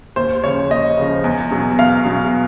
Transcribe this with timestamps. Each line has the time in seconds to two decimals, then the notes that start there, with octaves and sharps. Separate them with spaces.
0.16 D#2 C5
0.44 C#3 F3 C#5
0.70 D#2 D#5
0.98 C#3 F3
1.24 E2
1.51 B2 F#3
1.79 E2 F5
2.05 B2 F#3